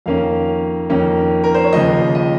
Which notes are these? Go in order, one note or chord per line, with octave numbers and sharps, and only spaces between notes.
F2 D#3 A#3 C#4 F5
F2 D#3 A#3 C#4
A#4
C5
C#5
D#2 C#3 F3 D#5
D#5